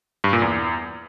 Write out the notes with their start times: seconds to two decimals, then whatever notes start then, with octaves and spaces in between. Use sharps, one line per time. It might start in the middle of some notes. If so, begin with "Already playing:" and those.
0.24 G2
0.33 A#2
0.42 E2